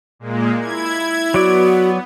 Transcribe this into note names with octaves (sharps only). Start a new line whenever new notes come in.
A#2 G#3 A#3
E4 G#6
F#3 B3 F#4 D5